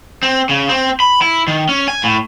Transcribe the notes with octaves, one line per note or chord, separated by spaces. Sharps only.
C4
C#3
C4
B5
E4
D#3
C#4
G#5
A2